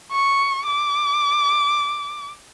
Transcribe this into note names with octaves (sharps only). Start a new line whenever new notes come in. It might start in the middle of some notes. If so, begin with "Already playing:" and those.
C#6
D6